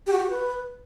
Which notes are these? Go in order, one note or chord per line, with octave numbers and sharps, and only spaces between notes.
G4
F#4
G4
F#4
B4